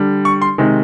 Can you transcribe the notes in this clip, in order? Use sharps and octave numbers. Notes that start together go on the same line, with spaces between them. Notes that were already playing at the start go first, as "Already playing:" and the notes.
Already playing: D3 G3
C#6
C6
C3 D#3 G#3